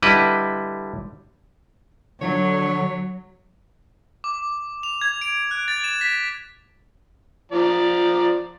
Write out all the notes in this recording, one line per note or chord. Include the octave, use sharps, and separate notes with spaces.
D3 G3 E4 B4 D#5
D3 F#3 C#5
D6
F7
G#6
D7
F#6
A6
E7
B6
F3 D5 A#5